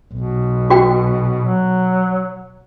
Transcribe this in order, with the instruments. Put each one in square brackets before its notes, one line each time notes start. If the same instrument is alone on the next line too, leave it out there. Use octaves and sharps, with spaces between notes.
[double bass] B1 [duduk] B2
[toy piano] F#4 G5
[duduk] F#3